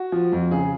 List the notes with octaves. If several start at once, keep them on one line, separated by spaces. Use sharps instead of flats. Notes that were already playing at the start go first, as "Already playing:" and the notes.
Already playing: F#4
F3
F2
C#3 G#4